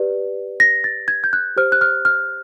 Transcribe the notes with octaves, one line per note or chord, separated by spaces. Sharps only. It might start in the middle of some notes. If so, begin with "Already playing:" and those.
Already playing: G4 B4 D5
A#6
A6
G#6
G6
F#6
G4 C5 F6
F#6
F6
F6